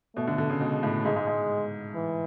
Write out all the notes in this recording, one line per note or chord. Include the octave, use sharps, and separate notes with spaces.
B2 A3
D3
D3
C#3
B2 G#3
A2
G#2 G#3
G#2
G#2
E3